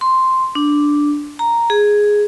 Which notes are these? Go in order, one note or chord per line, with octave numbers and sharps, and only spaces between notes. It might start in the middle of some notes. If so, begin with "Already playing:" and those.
C6
D4
A#5
G#4